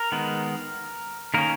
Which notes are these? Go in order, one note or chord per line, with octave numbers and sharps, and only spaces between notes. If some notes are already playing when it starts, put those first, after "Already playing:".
Already playing: A#4
D#3 G#3 B3
D#3 A#3 C#4 A#4